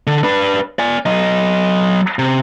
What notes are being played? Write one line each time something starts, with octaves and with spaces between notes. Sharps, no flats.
D3
D4 B4
D5 G#5
F#3 D#5
C3